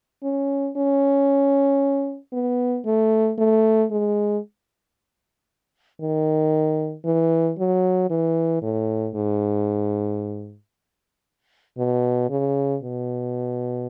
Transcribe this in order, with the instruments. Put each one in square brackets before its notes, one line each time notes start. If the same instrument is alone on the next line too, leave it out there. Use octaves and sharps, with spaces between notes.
[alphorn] C#4
C#4
B3
A3
A3
G#3
D#3
E3
F#3
E3
A2
G#2
B2
C#3
B2